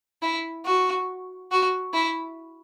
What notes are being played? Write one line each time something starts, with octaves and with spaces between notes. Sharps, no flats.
E4
F#4
F#4
E4